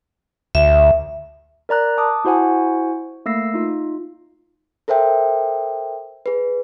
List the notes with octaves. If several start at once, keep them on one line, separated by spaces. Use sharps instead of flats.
D2 E5
A#4 D5 A#5 F#6
A5 D6 D#6
E4 F#4 C5 F#5 G#5
A3 A#3 E6 A#6 C7
D#4 F4
A4 A#4 C5 E5 G5
G#4 B4